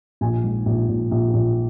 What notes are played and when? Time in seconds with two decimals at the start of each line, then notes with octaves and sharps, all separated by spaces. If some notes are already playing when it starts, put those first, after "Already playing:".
0.21 A#1 G#5
0.44 G#2
0.66 A#1
0.89 A#1
1.11 A#1
1.34 A#1